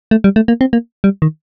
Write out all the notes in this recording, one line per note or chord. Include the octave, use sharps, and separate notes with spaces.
A3
G3
A3
A#3
C4
A#3
G3
D#3